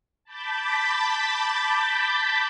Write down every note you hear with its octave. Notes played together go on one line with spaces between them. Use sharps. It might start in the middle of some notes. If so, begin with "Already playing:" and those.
A5 B5 D6 G6 A6 B6